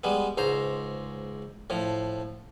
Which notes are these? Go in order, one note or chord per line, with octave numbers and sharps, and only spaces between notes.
G3 G#3 B3
C#2 G#2 C5 A#5
A2 F3